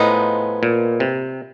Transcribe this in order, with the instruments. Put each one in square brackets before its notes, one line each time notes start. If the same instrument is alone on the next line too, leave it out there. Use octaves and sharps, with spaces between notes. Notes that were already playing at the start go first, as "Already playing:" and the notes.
Already playing: [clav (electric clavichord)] A2 [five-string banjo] F3 G#3 B3 D#4
[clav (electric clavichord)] A#2
C3